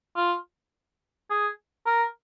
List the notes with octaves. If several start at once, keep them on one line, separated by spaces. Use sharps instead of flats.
F4
G#4
A#4